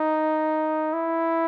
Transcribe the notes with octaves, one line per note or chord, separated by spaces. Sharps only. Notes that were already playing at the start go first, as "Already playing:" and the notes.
Already playing: D#4
E4